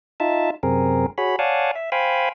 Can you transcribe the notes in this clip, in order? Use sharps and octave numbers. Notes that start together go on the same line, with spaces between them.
D#4 F4 E5 A5
F#2 C3 C4 G#4 A#4
F#4 G#4 C#5 B5
C#5 D5 F5 F#5 G#5 A5
E5
C5 F5 G5 G#5 B5